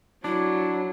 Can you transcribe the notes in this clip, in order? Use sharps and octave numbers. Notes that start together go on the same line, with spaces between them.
F#3 D4 E4